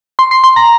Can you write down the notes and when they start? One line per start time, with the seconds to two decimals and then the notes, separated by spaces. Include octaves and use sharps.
0.19 C6
0.31 C6
0.44 C6
0.56 A#5